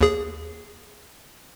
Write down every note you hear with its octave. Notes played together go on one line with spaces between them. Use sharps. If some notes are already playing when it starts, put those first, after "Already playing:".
D#2 G#4